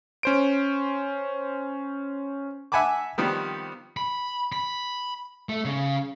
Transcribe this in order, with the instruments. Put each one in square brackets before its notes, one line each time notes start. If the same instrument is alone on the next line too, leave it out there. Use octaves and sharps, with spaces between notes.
[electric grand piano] C#4 C5 D7
[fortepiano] E5 F#5 G#5 A5 B5 D6
D#3 F3 G3 B3 C4
[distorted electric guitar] B5
B5
A3
C#3